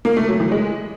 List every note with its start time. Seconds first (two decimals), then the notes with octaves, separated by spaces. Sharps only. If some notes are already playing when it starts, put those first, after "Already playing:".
0.05 A#3
0.16 A3
0.28 F#3
0.40 E3
0.51 G#3